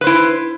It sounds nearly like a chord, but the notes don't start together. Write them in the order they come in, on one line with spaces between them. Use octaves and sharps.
B4 C5 E4